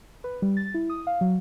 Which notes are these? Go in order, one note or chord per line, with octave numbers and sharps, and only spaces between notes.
B4
G3
A6
E4
D#6
F5
F#3